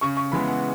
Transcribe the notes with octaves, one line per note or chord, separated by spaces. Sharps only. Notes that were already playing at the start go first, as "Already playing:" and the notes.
C#3 C#6
C#6
E3 G#3 B3 B5
F#5